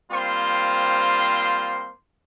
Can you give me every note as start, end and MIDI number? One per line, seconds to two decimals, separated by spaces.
0.11 1.92 55
0.11 1.92 58
0.11 1.92 60
0.11 1.92 65
0.11 1.92 72
0.11 1.92 84